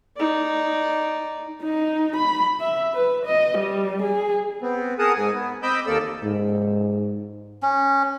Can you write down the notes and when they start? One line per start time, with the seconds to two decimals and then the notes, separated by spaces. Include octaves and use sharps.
0.17 D#4 D5
1.63 D#4
2.17 B5
2.60 E5
2.94 B4
3.26 D#5
3.58 G3
4.02 G#4
4.62 B3 C4
4.99 G#4 A#4 F#5 A5 D#6
5.15 G#2 G#5
5.33 B3
5.63 C4 D#5 B5 D6 E6 G6
5.86 D#2 A#3 A4 D5 E6
6.24 G#2
7.63 C#4